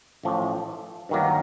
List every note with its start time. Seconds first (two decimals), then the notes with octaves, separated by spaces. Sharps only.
0.23 A1 A2 F3
1.09 G2 D#3 F#3 A#3